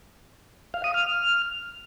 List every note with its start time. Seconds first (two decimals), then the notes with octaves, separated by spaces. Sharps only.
0.74 F5
0.84 D#6
0.94 F6